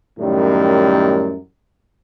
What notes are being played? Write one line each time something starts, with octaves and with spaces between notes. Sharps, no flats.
F#2 A2 D#3 G3